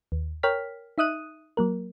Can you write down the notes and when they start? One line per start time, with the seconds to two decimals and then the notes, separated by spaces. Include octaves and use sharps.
0.12 D#2
0.43 A#4 C#5 G5 F6 B6
0.98 D#4 E5 D#6 F#6 D#7
1.57 F#3 A#3 A#4